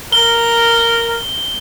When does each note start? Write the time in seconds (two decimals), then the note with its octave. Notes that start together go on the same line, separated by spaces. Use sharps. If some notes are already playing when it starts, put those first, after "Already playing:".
0.12 A#4 G7